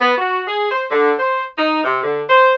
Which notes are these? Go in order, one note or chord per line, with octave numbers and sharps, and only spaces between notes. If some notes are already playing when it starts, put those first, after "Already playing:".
B3
F#4
G#4
C5
D3
C5
D#4
C3
D3
C5